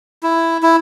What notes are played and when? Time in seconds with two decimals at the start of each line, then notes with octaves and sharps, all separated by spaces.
0.23 E4
0.63 E4